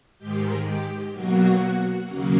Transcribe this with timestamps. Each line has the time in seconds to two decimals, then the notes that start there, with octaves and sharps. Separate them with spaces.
0.19 G#2 D#3 G#3 G4 G5
0.65 G4 G5
1.12 B2 F#3 A#3 F#4 F#5
2.05 D#2 C#3 F#3 A#3